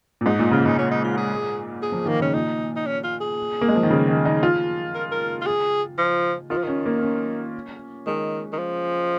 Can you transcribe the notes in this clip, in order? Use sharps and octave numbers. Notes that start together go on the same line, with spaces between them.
A#2
G#2 D#4
A#2
C#3 F4
C#3 D#4
A#2 C#4
D#4
F4
G#4
G#4
F3
D#3 A#3
C#3 C#4
A#2 D#4
D#4
C#4
F4
G#4
A#3
G#3
F3
D#3
C#3
D#3
D#4
F4
A#4
A#4
F4
G#4
F3
D#3 F4
F3
D#3 C#4
A#3
C#4
D#3 G#3
D#3
F3